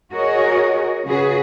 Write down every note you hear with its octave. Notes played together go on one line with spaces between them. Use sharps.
F#4 G#4 A#4 C#5 D#5
C#3 F#4 G#4 B4